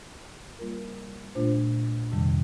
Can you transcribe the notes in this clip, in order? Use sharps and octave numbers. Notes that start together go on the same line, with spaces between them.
G3 A#3 F4 A#4
A#2 A3 D4 F4 C5
F2 C3 D#3 G3